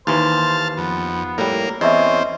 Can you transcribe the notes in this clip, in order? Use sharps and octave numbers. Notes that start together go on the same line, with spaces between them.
D#2 E3 C5 F5 A5
F2 B3
A2 G3 A#3
E2 C4 C#4 D#5 E5